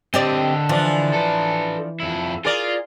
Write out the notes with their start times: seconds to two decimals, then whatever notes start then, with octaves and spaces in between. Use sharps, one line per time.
0.14 D3 C4 G4 D5 D#5
0.69 E3 F3 D4
1.13 A4 B4
2.00 F2 E4
2.45 F4 G#4 A#4 D5